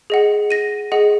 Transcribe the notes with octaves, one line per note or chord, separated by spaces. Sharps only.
G#4 D#5 F#5
A#6 D#7
G#4 D#5 F#5